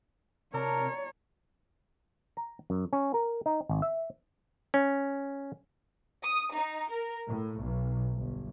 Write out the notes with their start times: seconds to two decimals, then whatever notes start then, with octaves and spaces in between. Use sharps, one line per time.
0.54 C3 A#4 C#5 D5 A5 A#5
2.37 A#5
2.70 F#2
2.93 C#4
3.14 A#4
3.46 D#4
3.69 G#1
3.82 E5
4.74 C#4
6.23 D#6
6.54 D#4
6.91 A#4
7.25 A2
7.61 B1
8.15 G1